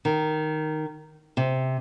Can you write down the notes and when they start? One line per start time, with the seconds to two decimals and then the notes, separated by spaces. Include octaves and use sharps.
0.05 D#3
1.37 C3